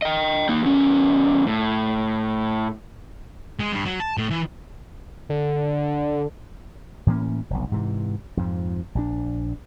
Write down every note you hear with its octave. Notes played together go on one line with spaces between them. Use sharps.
D#5 G5
A#3 D#4
E2 C#4
A2
G#3
G2
F#3
A5
A2
E3
D3
A2 E3 A#3 C#4
F1 B1
G#2 C3 E3
F2 G#2 F3
A#1 C#3 D4